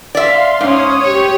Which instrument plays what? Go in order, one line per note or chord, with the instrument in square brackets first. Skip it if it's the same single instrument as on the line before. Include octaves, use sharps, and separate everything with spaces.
[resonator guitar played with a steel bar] D5 E5 [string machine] F5 C6
[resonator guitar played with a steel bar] G#2 [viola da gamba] C#4 [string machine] C#5 D#6
[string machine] G4 [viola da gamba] C#5